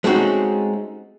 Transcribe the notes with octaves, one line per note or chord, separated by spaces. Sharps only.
G#3 A3 C4 C#4 D#4 F#4